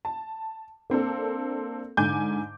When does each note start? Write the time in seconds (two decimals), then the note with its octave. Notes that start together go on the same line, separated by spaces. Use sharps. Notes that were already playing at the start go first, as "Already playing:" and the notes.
0.05 A5
0.90 A#3 C4 D4 A4
1.97 G#2 D3 G#5 D6 G6